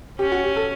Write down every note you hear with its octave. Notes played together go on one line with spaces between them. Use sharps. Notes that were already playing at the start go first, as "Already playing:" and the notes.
C#4 G4
F#4
G4
A4